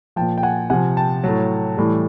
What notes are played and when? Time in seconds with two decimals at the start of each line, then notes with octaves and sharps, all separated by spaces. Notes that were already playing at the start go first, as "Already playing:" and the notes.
0.16 A#2 F3 G5 A5
0.38 G5
0.43 F#5 G#5
0.70 C3 F3 F#5 G#5
0.97 G5 A5
1.24 A2 F#3
1.77 A2 E3 G3